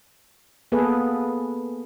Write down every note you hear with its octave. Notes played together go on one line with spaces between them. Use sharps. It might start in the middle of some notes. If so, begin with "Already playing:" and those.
A#3 B3 G#4 A4 B4